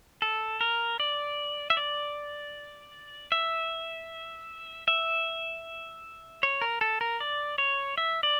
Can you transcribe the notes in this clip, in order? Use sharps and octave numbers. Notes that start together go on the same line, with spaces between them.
A4
A#4
D5
E5
D5
E5
E5
C#5
A#4
A4
A#4
D5
C#5
E5
D5